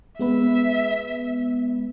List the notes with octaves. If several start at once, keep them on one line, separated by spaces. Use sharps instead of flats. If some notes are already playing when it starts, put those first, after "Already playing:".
G#3 B3 B4 E5